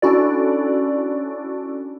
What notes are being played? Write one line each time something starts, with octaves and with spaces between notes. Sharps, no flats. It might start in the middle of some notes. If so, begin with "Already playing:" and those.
C#4 D4 E4 F#4 A4 D5